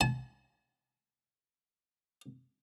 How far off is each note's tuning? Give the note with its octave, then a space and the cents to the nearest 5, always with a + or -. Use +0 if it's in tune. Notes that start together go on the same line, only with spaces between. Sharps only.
A5 -40